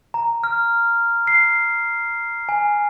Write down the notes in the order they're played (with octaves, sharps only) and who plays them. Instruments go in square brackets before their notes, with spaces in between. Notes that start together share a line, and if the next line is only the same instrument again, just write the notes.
[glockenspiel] A#5
F6
C7
G#5